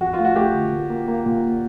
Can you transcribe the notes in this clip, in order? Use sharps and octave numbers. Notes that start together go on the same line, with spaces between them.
F2 F#4
F4
A3
F#4
A3 G4
D3
A#2
A#3
A#3
A#2